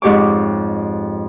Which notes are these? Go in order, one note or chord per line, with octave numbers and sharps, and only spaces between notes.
F2 G#2 G4 C#5 D6